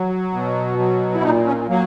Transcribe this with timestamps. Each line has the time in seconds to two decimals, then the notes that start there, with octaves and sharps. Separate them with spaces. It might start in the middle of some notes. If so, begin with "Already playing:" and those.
Already playing: F#3
0.33 B2
0.79 F#3
1.15 E4
1.23 A#2 D#4
1.46 C#4
1.69 F#3 A#3